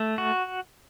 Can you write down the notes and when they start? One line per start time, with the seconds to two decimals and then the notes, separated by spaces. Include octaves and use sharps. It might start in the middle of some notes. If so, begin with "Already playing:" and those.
Already playing: A3
0.18 F#4